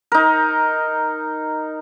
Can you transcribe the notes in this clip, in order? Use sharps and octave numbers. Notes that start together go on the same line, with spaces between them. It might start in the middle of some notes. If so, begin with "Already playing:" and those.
D#4 A#4